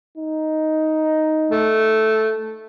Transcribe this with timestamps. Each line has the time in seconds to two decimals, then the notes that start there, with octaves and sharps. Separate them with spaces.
0.18 D#4
1.51 A3